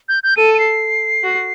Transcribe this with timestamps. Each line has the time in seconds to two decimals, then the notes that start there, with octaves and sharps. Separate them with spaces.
0.09 G6
0.23 G6
0.37 A4 D#7
0.54 D#7
0.59 C7
1.23 F#4